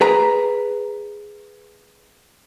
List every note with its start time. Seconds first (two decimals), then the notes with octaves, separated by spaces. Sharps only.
0.01 G#4 B4 A#5